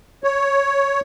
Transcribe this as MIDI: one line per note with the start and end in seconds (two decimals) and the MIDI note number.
0.24 1.01 73